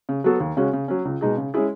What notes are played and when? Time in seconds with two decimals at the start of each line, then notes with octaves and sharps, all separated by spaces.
0.09 C#3
0.24 F#3 B3 F#4 A4
0.40 D#2
0.57 C#3 G#3 C#4 F#4
0.73 C#3
0.88 F#3 C#4
1.05 C#2
1.21 B2 G#3 D#4 G#4
1.37 C#3
1.54 G#3 C#4 E4 G#4